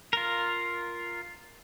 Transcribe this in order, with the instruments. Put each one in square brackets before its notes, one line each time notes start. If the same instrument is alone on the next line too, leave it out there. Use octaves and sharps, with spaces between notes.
[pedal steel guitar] F4 A#4